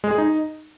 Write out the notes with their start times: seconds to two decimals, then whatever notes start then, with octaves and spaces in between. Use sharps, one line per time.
0.04 G#3
0.11 G#4
0.18 D#4